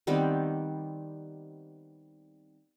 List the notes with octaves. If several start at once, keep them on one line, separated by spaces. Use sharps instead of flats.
D#3 G3 B3 C4